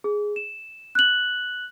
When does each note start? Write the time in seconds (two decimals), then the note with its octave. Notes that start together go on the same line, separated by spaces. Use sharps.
0.04 G#4
0.36 E7
0.95 F#6 F#7